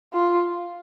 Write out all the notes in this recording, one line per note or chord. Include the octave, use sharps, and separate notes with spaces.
F4